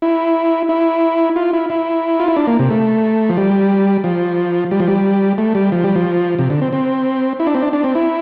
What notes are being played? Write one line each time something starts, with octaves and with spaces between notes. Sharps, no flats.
E4
E4
F4
E4
E4
F4
E4
D4
A#3
C3
A3
F3
G3
F3
G3
F3
G3
A3
G3
F3
G3
F3
C3
D3
C4
C4
E4
D4
C4
D4
D4
C4
E4